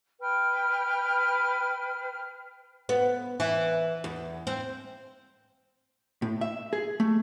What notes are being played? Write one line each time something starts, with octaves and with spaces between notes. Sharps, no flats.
B4 G5 F6
B3
E3
E2
C4
A2
E5
G#4
A3